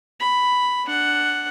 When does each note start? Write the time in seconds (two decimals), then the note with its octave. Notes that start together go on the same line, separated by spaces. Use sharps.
0.20 B5
0.85 D4 F#5